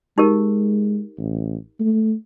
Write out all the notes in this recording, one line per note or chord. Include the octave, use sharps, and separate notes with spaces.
G#3 D#4 G4 A#4
A1
A3